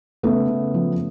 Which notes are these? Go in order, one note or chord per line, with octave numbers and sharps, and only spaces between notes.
C#3 A3 B3
C#3
F3